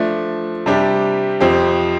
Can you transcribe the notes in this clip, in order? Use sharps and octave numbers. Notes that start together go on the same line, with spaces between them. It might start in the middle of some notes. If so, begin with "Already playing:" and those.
Already playing: F3 A3 D4
C3 G3 D4 G4
F2 F3 C4 G4